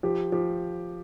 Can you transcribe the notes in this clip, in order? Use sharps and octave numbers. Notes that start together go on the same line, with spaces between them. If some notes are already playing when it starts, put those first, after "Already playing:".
F3 G4
F3 G4